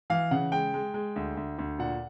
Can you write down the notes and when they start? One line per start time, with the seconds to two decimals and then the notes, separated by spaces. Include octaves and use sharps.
0.10 E3 F5
0.31 C#3 F#5
0.52 G#3 G5
0.74 G#3
0.94 G#3
1.16 D2
1.37 D2
1.59 D2
1.79 A#2 F#5